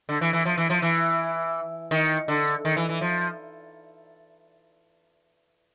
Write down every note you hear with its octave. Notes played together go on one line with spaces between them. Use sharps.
D3
E3
E3
F3
E3
F3
E3
D#3
D3
D#3
E3
E3
F3